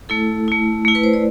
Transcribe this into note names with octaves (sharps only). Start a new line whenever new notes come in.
A3 E4 A4
A3 E4
A3 E4
B4
C5
D5